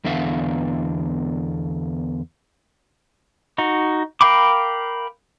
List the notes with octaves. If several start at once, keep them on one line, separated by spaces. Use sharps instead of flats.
E2 D3 B3 E5 F5
D#4 F#4
A#4 F5 G5 B5 D6